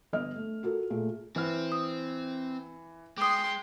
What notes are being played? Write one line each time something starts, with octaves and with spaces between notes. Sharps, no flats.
G1 B3 D#5 F6
A3
F4 F#4 A4 A#4
A#2 A3 G#4
E3 C4 F6
D#6
G#3 G5 C6 D6 D#6